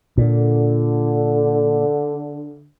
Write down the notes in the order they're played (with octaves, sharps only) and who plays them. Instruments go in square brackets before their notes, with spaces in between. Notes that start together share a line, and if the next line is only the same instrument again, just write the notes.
[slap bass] A#2 [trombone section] D3